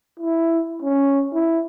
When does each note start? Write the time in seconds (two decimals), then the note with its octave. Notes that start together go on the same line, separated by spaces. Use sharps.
0.20 E4
0.82 C#4
1.34 E4